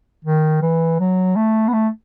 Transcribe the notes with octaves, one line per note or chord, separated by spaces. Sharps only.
D#3
E3
F#3
A3
B3
A3